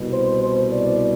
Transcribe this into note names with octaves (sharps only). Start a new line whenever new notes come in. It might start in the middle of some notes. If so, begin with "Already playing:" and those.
Already playing: C2 B2
C5
C5
D5